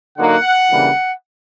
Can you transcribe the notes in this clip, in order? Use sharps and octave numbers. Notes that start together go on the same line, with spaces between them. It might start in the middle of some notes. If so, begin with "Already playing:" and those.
D3 F#3 A#3 D#4 F#5
C#3 E3 G3 A#3 D4